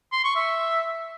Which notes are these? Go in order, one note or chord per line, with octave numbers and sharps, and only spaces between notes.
C6
C#6
E5